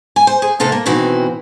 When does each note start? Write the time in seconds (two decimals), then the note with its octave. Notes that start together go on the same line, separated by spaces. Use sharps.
0.16 G#5
0.27 C5
0.42 G#4
0.60 C3 A3 A4 F5
0.72 A#3
0.86 B2 D#3 E3 C4 F#4